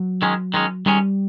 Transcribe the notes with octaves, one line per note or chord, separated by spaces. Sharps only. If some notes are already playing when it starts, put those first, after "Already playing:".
Already playing: F#3
D#3 G#3 C#4
D#3 G#3 C#4
D#3 G3 G#3 C#4